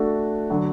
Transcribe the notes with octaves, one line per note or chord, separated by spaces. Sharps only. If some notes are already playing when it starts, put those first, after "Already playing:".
Already playing: A3 D4 F#4 A4
D3 F#3